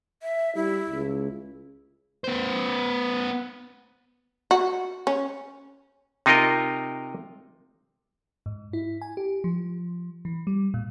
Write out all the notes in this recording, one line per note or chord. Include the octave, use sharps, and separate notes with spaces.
E5
G3 E4
C#2
B3 C5
F#4
C#4
C3 D#4 F4 A#4 D#5
G#2
E4
G#5
G4
F3
E3
G3
A#2